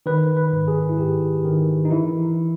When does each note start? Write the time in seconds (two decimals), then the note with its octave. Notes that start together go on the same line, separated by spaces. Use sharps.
0.06 D#3 B4
0.37 B4
0.52 G#2
0.68 G#4
0.89 E4
0.98 G#2 G4
1.45 D#3
1.85 D#4
1.91 E3 E4